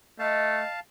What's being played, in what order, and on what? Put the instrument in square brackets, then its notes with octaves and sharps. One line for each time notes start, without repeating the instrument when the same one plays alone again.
[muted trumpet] A3 [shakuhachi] D#5 [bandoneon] F5 A5